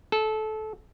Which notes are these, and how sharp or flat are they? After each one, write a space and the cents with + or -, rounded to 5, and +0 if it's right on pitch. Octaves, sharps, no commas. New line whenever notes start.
A4 -20